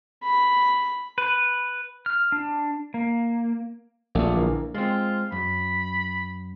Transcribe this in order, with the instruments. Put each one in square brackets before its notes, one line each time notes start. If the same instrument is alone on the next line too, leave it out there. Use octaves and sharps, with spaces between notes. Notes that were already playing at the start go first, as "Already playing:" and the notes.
[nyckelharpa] B5
[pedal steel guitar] B4
F6
D4
A#3
[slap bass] A#1 [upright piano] A3 D4
[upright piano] D3 E3 A#3
[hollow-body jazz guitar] G#3 C4 [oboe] F4
[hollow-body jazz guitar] F#2 [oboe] B5